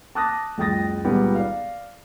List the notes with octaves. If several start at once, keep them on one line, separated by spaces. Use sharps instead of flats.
A5 D6 D#6 F#6 A6 A#6
F#1 C#2 G5 D#6 A6 A#6
C#2 A#2 D#3 G3 B3
D5 F5